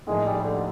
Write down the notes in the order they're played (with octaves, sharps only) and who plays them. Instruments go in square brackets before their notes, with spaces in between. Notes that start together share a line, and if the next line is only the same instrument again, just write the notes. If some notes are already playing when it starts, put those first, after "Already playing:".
[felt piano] A2 F3 A#3 D#4 [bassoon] G#3
[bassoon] G3
D3